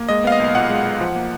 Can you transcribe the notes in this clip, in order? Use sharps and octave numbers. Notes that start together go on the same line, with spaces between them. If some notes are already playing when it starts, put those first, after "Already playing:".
Already playing: A#3
G#3 D#5
B3 F5
D#5
B1
A#2 F#5
G#3
B3
F3
A#3